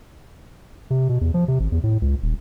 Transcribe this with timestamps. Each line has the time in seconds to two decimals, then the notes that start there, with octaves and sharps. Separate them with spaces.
0.90 C3
1.09 B2
1.21 E2
1.34 F3
1.48 C3
1.60 G#1
1.72 E2
1.83 A2
2.02 C#2
2.22 D#1